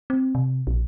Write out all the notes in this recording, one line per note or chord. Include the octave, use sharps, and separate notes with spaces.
C4
C3
A#1